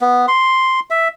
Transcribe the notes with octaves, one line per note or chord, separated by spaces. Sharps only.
B3
C6
E5